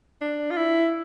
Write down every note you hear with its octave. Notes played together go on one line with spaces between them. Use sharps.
D4
F4
E4